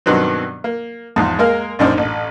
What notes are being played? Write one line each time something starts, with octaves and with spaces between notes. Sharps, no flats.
G2 B2 D#3 F#3 B3 C4
A#3
E2 G#2 F3
G#3 A#3 A#4 F5
A#1 F#2 D4 D#4 C5
A1